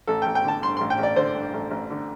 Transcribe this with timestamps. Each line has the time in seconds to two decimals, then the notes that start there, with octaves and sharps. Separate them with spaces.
0.07 A1 A4
0.22 A1 G5
0.35 G5
0.45 D3 A5
0.62 G2 C6
0.77 A1 C6
0.90 G5
0.99 A1 D5
1.16 D3 C5
1.35 G2
1.54 A1
1.71 A1
1.90 D3